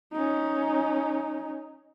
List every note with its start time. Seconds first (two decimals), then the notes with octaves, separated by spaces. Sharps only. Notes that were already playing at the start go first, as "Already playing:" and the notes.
0.13 C#4 D#4